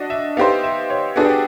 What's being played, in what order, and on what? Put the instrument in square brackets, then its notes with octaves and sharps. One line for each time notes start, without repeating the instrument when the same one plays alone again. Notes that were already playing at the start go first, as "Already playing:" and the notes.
Already playing: [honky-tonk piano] D4 F#4 [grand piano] D#5
[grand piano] E5
[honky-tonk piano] B3 D#4 G4 C5 [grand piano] F5
[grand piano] E5
C#5
[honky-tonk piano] B3 D4 F#4 A4 [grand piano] G#4
[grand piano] G4